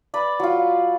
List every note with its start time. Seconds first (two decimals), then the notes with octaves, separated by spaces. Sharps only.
0.14 B4 D5 B5
0.40 F#3 F4